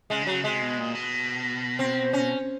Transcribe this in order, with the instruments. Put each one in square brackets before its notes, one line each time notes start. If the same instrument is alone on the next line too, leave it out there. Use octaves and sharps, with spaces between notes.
[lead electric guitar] C#3 [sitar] G#3
[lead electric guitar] D3
[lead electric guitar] C#3 [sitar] F#3
[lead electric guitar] C3 [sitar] G#3
[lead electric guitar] B2
A#2
B2
[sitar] C4
C#4